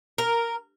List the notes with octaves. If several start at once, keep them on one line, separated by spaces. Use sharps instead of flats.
A#4